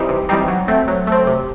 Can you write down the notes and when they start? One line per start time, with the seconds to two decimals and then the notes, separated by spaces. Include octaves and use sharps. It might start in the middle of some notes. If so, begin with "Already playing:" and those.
Already playing: E3 G3 C4 D#4
0.09 C3
0.29 E3 G3 C4 D#4
0.48 F#3
0.68 A3 C4
0.88 F#3
1.07 A3 C4
1.27 C3